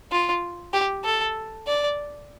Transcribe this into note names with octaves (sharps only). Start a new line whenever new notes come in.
F4
G4
A4
D5